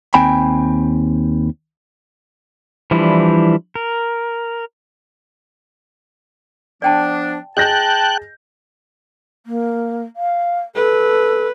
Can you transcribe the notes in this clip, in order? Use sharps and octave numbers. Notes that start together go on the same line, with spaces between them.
D#2 C4 G5 G#5 B5
E3 F3 G3 D4 E4
A#4
F3 B3 D4 D5 G5 A5
G#4 D#5 G5 A5 F#6 G6 A#6
A#3
F5
A4 B4